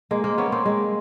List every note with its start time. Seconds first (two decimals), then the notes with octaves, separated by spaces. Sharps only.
0.11 G#3 A#3
0.24 A#3 C4
0.38 B3 C#4
0.52 A#3 C4
0.66 G#3 A#3